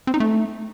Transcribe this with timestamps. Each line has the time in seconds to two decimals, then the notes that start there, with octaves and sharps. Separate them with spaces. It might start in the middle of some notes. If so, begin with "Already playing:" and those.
0.07 C4
0.14 D#4
0.20 A3